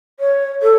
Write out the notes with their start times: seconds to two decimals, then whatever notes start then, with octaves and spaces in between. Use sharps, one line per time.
0.20 C#5
0.63 A4